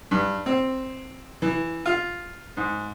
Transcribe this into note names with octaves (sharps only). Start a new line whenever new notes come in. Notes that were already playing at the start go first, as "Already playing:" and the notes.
G2
C4
E3
F4
G#2